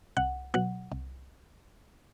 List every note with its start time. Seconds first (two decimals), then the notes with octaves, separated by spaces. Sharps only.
0.17 C2 F#5
0.54 B2 F#3 F#5
0.92 C2